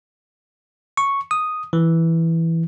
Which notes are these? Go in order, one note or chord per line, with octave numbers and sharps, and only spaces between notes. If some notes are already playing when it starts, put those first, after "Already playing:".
C#6
D#6
E3